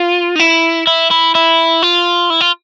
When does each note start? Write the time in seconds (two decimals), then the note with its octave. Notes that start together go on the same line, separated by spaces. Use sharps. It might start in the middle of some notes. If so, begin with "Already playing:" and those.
Already playing: F4
0.36 D#4
0.40 E4
0.87 E4
1.11 E4
1.35 E4
1.82 F4
2.30 E4
2.41 F4